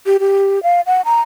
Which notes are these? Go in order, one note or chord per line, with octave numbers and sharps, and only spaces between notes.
G4
G4
F5
F#5
A#5